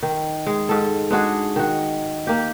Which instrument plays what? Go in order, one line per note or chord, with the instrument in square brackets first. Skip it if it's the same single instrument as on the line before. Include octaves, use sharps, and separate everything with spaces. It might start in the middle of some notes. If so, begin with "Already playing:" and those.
[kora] D#3
G#3
G#2 A4
G#3 D4 F#4 G#4
D#3 F#4
A#3 G4